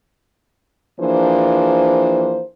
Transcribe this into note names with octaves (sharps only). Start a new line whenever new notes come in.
E3 F3 A#3 D4 G#4 C5